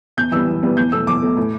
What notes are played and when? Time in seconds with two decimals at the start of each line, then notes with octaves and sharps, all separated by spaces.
0.17 E2 G6
0.32 E3 G3 B3 E6
0.47 E2
0.63 E3 G3 B3
0.77 E2 G6
0.92 B2 A3 E6
1.07 E2 D6
1.22 B2 A3
1.37 A2